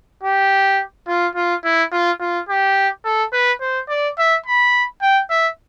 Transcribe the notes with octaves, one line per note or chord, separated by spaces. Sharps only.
G4
F4
F4
E4
F4
F4
G4
A4
B4
C5
D5
E5
B5
G5
E5